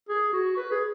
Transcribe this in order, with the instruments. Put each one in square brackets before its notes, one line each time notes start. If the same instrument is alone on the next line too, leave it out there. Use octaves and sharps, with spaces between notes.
[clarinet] G#4
F#4
B4
G#4